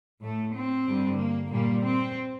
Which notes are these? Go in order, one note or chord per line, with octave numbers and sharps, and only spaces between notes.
A2 A3
C4
G2 D3 G3
A#3
A#2 G3 A#3
C4